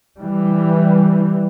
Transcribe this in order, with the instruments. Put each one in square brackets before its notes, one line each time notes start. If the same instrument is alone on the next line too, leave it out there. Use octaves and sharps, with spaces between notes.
[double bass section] E3 G3